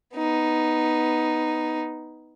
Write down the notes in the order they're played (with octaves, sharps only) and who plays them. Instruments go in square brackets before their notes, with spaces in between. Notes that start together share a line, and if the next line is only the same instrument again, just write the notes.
[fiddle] B3 D#4